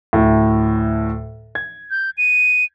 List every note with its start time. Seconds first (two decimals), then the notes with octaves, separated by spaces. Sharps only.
0.13 D2 A2
1.55 G#6
1.91 G6
2.18 D#7